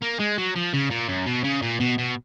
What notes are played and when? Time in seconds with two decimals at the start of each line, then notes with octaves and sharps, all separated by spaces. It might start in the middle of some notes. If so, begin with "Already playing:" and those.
0.02 A#3
0.19 G#3
0.38 F#3
0.56 F3
0.73 C#3
0.91 A#2
1.09 F#2
1.26 B2
1.44 C#3
1.62 A#2
1.80 B2
1.98 B2